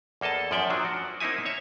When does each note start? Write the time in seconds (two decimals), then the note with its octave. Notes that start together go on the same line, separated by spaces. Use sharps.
0.21 E2 A#3 A4 D#5 A5
0.51 F#2 F3 D5 E5 G5
0.70 F3 F#3 D4
0.85 F#4
1.20 A#3 C4 D#4 E4 G#5
1.45 C#5 E5